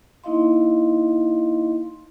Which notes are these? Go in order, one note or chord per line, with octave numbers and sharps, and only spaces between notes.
A#3 D#4 E4 D#5 F5 C6